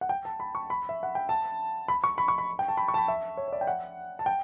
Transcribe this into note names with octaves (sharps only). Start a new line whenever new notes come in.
F#5
G5
A5
B5
C#6
B5
E5
F#5
G5
A5
B5
C#6
B5
C#6
B5
G5
A5
B5
C#6
A5
B5
E5
C#5
C#5
D5
G5
F#5
A5
G5